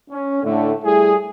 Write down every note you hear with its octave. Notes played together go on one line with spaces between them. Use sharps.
C#4
A2 D3 A3
G3 A3 E4 G#4